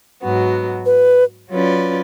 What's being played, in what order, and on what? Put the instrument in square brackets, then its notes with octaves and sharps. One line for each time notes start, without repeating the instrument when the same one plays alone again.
[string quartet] G#2 F#3 B3 F#4
[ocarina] B4
[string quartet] F#3 C#4 F4 B4 D5